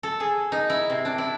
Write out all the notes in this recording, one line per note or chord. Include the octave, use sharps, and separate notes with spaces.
A4
G#4
D#4
E4
C3
D4
E4